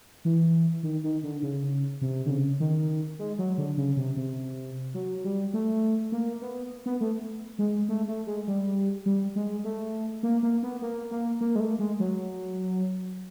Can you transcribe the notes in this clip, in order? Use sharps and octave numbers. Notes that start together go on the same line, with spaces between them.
E3
D#3
D#3
D3
C#3
C3
D3
C#3
D#3
G#3
F#3
D3
C#3
C3
C3
F#3
G3
A3
A#3
B3
B3
A3
G#3
A3
A3
G#3
G3
G3
G#3
A3
A#3
A#3
B3
A#3
A#3
A#3
G#3
A3
G#3
F#3